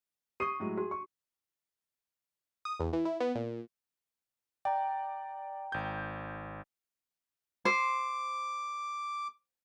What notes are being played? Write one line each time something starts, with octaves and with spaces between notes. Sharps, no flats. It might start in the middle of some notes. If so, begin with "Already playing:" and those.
G4 C#6 D#6 C7 D#7
A2 F#3 G#3
F#4 G#4
C#6
D#6
E2
E3
E4
B3
A#2
D5 G5 A#5
G#1 G6
C5 D6